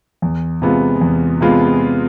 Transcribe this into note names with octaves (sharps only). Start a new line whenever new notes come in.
E2
C3 G#3 B3 F4
E2
C3 G#3 B3 F4